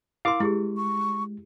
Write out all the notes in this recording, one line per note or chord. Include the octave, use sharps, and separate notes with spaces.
E4 A#4 F5 C6 D6
G#3 E4 G4 G#4
C#6